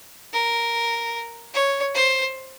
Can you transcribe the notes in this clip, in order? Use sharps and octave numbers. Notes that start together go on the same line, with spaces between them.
A#4
C#5
C5